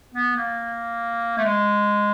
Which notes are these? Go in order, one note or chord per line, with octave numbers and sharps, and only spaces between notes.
B3
A#3
A3
G#3